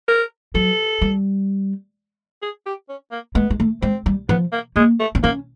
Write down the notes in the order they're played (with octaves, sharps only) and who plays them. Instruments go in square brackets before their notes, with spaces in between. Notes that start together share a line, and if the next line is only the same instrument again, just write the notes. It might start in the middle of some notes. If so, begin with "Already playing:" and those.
[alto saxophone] A#4
[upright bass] F#3 [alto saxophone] A4
[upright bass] G3
[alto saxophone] G#4
G4
C#4
A#3
[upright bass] G#3 [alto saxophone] B3
[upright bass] G#3
A3
[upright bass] G#3 [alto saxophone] C4
[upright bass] G3
[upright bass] F3 [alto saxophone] B3
[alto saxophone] A#3
[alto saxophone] G#3 [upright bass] A#3
[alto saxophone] A3
[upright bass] C4
[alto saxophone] A#3 [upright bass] C#4